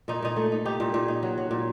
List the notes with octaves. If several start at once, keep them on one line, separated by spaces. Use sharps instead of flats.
A#2 D#4
A#2 D#4
A3
D#4
D#4 G4
A#2
A#2
D#4
F#3
F#3
A#2